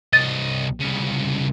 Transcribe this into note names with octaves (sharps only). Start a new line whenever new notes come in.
C2 D#5 A6
C2 C#3